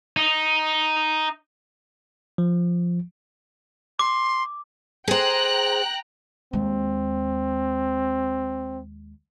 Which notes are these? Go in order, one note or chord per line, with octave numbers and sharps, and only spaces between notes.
D#4
F3
C6 D6
G#4 C5 G5 A#5 F#6
D#2 G#3 C4